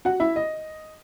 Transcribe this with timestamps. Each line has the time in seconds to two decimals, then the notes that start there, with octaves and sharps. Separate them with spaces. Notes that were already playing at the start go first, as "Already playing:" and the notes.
0.05 F#4 F#5
0.20 E4 E5
0.36 D#5